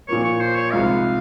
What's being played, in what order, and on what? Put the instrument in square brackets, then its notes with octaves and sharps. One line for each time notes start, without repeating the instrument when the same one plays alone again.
[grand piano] A#2 F3 A#3 [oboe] C#5
[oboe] C#5
C5
C#5
[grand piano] C2 C3 F3 G#3 D#4 [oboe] F5